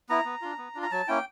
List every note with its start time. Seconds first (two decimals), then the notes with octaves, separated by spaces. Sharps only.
0.09 B3 E4 A#5
0.25 B3
0.42 D4 F4
0.58 B3
0.75 D4 F4
0.82 A#5
0.91 F#3 A5
1.08 A#3 C#4 E4 G5